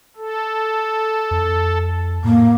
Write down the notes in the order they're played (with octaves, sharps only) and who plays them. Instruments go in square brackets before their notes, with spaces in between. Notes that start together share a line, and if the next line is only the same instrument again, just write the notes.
[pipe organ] A4
[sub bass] F2
[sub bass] A2 [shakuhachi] A#3